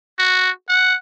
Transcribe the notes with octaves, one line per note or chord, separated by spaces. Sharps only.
F#4
F#5